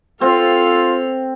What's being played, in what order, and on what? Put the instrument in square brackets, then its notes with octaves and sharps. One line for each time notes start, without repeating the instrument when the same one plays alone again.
[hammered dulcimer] C4 [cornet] F4 [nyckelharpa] A4 F5